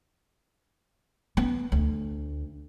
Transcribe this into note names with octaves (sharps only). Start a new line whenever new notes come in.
B3
D2